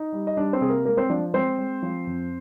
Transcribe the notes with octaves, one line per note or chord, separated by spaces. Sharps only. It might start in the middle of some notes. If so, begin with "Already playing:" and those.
Already playing: D#4
G3
D#5
G3 D4 D5
C4 C5
C3 G#4
A#3 A#4
G#3 A#3 A#4
C4 C5
F3 D4 D5
G#3 C4 C5
G#3
F3
F2